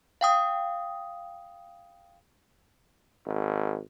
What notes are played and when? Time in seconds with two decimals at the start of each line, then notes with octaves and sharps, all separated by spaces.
0.21 F5 G5 D#6
3.26 G#1